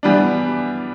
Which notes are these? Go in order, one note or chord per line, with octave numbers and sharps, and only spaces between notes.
E3 G3 B3 D4